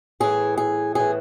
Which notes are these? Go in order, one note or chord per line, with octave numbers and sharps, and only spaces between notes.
A2 E3 G#4
G#4
A2 E3 G#4